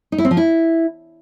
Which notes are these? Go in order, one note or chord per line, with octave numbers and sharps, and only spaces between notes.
D#4
E4
C4
F3
E4